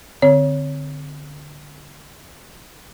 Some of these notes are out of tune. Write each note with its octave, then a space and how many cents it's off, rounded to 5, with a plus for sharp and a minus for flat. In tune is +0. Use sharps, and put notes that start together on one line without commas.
D3 +0 C4 -5 C#5 +15